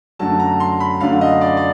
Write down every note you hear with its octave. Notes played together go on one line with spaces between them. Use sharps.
F#2 D3 F#3 A3 A5
A#5
C6
B5
F#2 D3 F#3 A3 F5
D#5
D5
D5